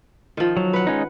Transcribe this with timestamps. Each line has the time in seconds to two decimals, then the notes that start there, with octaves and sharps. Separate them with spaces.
0.37 D#3 F3
0.57 F#3
0.73 B4 F#5
0.87 G#3 C#4 D#4